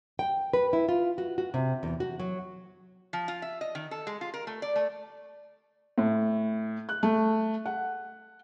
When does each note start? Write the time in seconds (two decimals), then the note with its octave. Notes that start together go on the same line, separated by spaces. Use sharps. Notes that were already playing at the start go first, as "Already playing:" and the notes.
0.19 G5
0.53 B4
0.73 E4
0.89 F4
1.18 F#4
1.38 F#4
1.54 C3
1.83 E2
2.00 F#4
2.19 F#3
3.13 F3
3.28 F4
3.42 E5
3.61 D#5
3.75 D#3
3.91 A4
4.07 G#3
4.21 F4
4.34 A#4
4.47 A3
4.62 D5
4.76 A3
5.98 A2
6.89 F#6
7.03 A3
7.66 F#5